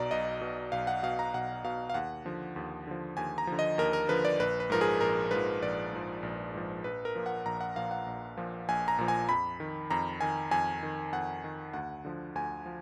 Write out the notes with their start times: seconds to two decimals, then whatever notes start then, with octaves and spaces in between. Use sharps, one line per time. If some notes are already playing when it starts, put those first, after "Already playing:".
Already playing: B1 B2 D5 A#5
0.11 B1 D#5
0.41 B2
0.72 B1 F5
0.87 F#5
1.03 B2 F5
1.19 A#5
1.34 B1 F#5
1.64 B2 F5
1.90 F5
1.94 D#2 F#5
2.25 D3 F3
2.56 D#2
2.87 D3 F3
3.17 D#2 G#5
3.38 A#5
3.47 D3 F3
3.59 D#5
3.78 D#2 A#4
3.93 A#4
4.08 D3 F3 B4
4.25 D5
4.40 A#1 B4
4.60 B4
4.70 G#2 F3 A#4
4.81 G#4
5.01 A#1 A#4
5.31 G#2 F3 B4
5.62 A#1 D5
5.93 G#2 F3
6.23 A#1
6.54 G#2 F3
6.84 A#1 B4
7.05 A#4
7.15 A#2 F3
7.26 F#5
7.46 A#1 A#5
7.61 F#5
7.76 A#2 F3 F5
7.91 F#5
8.06 A#1
8.37 A#2 F3
8.68 A#1 G#5
8.88 A#5
8.99 A#2 F3
9.08 G#5
9.29 F2 B5
9.60 D#3
9.90 F2 A#5
10.21 D#3 G#5
10.51 F2 G#5
10.83 D#3
11.12 F2 F#5
11.44 D#3
11.74 D2 F#5
12.05 D3 F3
12.35 D2 G#5
12.66 F3